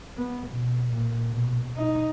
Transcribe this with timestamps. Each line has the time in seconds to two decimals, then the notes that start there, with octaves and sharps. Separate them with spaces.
0.17 B3
0.47 B2
0.93 A#2
1.31 B2
1.76 D#4